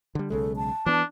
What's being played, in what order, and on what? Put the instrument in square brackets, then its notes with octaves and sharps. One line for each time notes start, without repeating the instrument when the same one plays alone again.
[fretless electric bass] D3 G3
[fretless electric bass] B1 C#3 G#3 [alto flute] A4
[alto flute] A5
[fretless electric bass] E3 B3 [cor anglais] D4